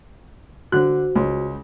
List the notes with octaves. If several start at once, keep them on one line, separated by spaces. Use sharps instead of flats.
D3 F#4 C5 F#6
C#2